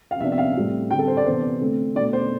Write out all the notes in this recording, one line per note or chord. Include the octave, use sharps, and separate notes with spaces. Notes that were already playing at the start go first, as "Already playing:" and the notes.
F5
C3 F3 B3 D4 E5
E5
F5
A2 G3 C4
D3 G3 C4 G5
A4
C5
D5
C3 E3 B3 D4 C5
D3 A3 C4
B2 A3 D4 D5
C5